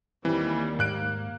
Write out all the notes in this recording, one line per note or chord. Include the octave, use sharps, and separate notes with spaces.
D#2 E3 G3 C4
G#2 A#3 F#6 D7